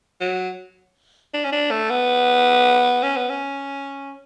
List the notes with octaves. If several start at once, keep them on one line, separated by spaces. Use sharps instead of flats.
F#3
D4
C#4
D4
A3
B3
C#4
B3
C#4